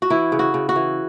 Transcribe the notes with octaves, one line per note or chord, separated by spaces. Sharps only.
F#4
E3 E4
C#3
F#4
C#3
F#4
E3